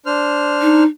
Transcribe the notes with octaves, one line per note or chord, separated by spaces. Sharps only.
D4 C5 F6
D#4